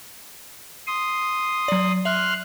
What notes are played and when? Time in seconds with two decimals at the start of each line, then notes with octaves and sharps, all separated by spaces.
0.87 C6 D#6
1.68 F#3 D5
2.05 E5 C6 F6 F#6